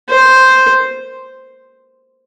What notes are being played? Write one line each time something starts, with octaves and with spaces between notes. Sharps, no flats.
C5